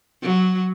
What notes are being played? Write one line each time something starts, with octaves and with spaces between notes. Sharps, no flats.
F#3